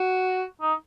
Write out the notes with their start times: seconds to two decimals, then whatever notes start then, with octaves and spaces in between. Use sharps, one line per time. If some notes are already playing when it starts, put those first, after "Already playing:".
Already playing: F#4
0.62 D#4